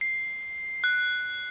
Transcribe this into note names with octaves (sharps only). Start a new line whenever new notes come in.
C7
F#6